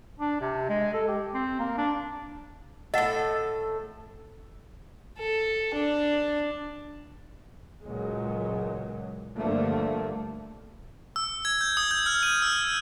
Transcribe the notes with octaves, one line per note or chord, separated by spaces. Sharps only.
D4
C3
G#3
A4
G4
C4
A#3
D4
A2 A4 D#5 F#5
A4
D4
C#2 A#2 F#3 G#3
G2 D3 F3 A3 A#3
E6
G#6
G6
D#6
G6
F6
D#7
E6